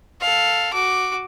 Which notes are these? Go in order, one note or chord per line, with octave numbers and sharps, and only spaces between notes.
A4 F5
F#4 D6